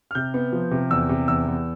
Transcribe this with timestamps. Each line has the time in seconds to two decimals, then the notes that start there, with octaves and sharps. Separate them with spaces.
0.11 F6
0.15 C3 G6
0.34 B3
0.52 F3
0.71 C3
0.91 E2 E6
1.09 C3
1.28 E2 E6
1.47 E2